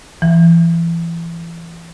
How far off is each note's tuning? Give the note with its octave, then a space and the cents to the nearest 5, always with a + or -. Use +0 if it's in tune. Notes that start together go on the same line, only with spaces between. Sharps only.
E3 +30